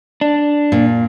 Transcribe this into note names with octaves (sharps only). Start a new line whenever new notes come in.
D4
A#2